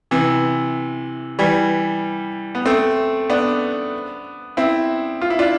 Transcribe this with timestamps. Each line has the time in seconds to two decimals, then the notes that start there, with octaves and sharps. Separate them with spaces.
0.11 C3 E3
1.39 E3 G3
2.55 B3
2.66 A3 C4
3.30 B3 D4
4.57 C4 E4
5.22 F4
5.30 E4
5.39 D4 F4